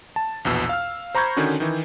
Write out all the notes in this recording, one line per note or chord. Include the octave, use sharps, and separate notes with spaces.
A5
A#1 E2 B2 E6
F5 F6
C5 A#5 B5 C#6 G6 G#6
D3 D#3 C#4 D4 F#4
D#3 E3